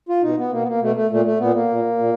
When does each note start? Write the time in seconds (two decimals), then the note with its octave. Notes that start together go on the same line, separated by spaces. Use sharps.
0.09 F4
0.22 B2 D#4
0.38 B3
0.52 B2 A#3
0.62 B3
0.67 A#3
0.81 B2 A3
0.95 A3
1.10 A#2 A3
1.25 A3
1.39 A#2 B3
1.54 A#3
1.69 A#2
1.99 A#2